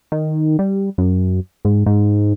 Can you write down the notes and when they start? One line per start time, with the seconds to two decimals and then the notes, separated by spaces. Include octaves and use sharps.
0.12 D#3
0.59 G3
0.98 F#2
1.65 G#2
1.86 G#2